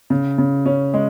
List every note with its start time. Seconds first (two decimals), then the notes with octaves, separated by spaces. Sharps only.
0.10 C#3
0.38 C#3
0.66 C#4
0.94 G#3